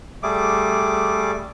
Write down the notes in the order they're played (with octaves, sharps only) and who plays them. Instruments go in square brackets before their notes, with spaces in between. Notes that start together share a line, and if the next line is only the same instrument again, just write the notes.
[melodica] G3 A3 G#4 D6